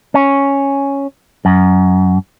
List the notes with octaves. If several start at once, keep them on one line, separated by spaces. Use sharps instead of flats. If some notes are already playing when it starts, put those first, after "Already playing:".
C#4
F#2